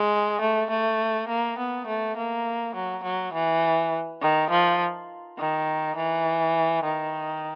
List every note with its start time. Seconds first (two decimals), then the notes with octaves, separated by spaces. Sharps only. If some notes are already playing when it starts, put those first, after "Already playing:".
Already playing: G#3
0.41 A3
0.70 A3
1.28 A#3
1.58 B3
1.87 A3
2.17 A#3
2.75 F#3
3.04 F#3
3.34 E3
4.21 D#3
4.50 F3
5.38 D#3
5.97 E3
6.84 D#3